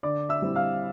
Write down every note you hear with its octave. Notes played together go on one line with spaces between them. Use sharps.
D3 D5 D6
E5 E6
G3 C4 E4
F5 F6